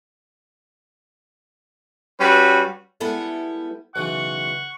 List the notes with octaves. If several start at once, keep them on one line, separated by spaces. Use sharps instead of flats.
G3 C#4 F#4 B4
G3 G#3 B3 E4 A4
B1 C#3 E3 F#5 C#6